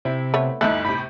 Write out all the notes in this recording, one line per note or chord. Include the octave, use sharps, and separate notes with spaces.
C3 C4 E4
A3 B3 C#5
G1 D2 A3 D#4 E4 A4 F#6
A2 C3 B5